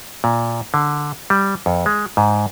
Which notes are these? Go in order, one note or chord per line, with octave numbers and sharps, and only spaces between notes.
A#2
D3
G3
F2
G#3
G#2